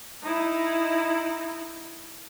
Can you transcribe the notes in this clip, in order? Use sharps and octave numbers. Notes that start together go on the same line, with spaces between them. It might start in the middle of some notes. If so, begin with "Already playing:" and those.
D#4 E4